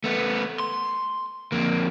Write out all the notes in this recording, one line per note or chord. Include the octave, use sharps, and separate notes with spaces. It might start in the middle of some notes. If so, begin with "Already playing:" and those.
A3 B3
C6
F2 A#3